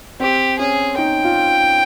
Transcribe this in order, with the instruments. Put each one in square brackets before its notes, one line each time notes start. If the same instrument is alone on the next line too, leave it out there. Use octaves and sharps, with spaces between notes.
[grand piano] C4 [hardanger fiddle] G4
[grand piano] C#4 [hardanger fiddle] G#4
[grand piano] D#4 [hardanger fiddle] G5
[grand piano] F4